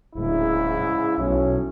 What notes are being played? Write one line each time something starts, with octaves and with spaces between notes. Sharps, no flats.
D1 G#2 C#3 E4
B1 A2 F#3 C#4